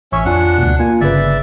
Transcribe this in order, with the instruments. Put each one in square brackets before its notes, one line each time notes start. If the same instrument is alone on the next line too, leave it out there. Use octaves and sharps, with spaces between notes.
[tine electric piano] A1 C#6 [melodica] C#4 C#5 E5
[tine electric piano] F2 F4 G#5 [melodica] D4 F#5
[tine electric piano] D2 B2
[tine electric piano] A#3 F4 [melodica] G#5
[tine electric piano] G1 C#3 B4 [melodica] D5 E5